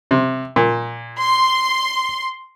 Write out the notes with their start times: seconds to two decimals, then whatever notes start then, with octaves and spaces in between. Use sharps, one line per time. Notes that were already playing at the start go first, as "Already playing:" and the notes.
0.11 C3
0.56 A#2
1.20 C6